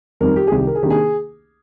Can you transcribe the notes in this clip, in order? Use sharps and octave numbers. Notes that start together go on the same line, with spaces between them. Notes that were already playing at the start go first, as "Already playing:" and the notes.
F2 D#3 G3 C4 D#4 A#4
G4
G#4
C2 C3 D#3 G4
A#4
G#4
C3 D#3 A#3 D4 G4
G#4